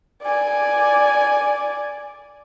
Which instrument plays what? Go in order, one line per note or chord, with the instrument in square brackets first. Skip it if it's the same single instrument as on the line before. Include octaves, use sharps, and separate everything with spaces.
[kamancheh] D5 G#5